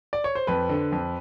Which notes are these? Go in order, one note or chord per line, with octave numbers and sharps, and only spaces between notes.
D5
C#5
C5
F2 B4
D3
F2